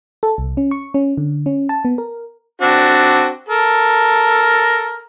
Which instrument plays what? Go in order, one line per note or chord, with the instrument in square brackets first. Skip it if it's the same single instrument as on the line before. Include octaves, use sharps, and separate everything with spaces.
[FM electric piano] A4
C2
C#4
C#6
C#4
D3
C#4
A5
B3
A#4
[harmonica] C4 D4 F#4
A4 A#4